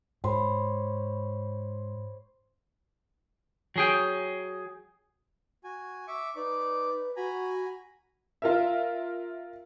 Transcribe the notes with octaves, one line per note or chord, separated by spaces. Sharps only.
G#2 C5 C#5 B5
F#3 G#4 G5
F#4 G#5
E5 C#6 D6
D#4 B4 D5 D6
F#4 G#5 A#5 B5
F4 A#4 E5